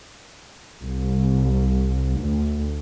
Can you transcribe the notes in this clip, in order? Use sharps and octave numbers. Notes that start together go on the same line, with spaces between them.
C2
D2